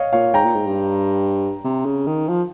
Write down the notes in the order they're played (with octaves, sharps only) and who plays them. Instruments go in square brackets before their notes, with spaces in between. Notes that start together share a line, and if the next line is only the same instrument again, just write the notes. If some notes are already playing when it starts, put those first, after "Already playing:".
Already playing: [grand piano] C#5 D#5 F5
[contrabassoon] A#2 [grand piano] C#5 F5
[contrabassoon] G#2 [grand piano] G5 A#5
[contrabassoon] A#2
G#2
G2
C3
C#3
D#3
F3